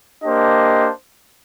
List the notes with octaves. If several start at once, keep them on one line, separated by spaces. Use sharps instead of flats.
A#3 D4 G4 C5 D#5